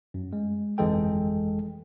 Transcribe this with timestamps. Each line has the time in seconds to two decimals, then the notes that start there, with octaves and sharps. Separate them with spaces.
0.14 F#2
0.33 G#3
0.78 G1 F2 E3 G#3 A4 G5